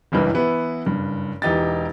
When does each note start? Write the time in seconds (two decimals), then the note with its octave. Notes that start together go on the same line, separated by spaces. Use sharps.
0.12 F#1 C#2 G2 E3
0.34 E3 B3 E4 B4
0.86 F#1 G2
1.42 E1 E3 D#4 G4 A6